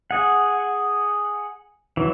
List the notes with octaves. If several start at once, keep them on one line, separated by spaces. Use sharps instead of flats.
G#4 F#5
E3 F#3